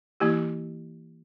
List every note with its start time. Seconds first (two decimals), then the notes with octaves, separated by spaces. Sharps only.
0.20 E3 A#3 E4 G4